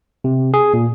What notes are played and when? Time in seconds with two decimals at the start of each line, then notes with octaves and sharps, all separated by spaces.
0.24 C3
0.54 G#4
0.74 A#2